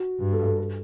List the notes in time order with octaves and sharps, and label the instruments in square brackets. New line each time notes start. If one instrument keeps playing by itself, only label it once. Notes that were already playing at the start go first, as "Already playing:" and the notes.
Already playing: [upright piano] F#4
[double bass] G2
[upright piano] A4
A4
A4